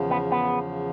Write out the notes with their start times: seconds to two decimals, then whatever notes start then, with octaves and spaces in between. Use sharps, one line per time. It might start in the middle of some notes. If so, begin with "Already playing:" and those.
Already playing: E2 C#3 F3
0.10 B3
0.32 B3